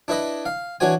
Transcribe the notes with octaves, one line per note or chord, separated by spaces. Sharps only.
D4 E4 B4 D#5
F5
E3 D4 F#4 C#5 G#5